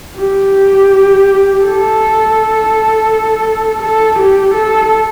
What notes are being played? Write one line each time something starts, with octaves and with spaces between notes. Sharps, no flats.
G4
A4
A4
G4
A4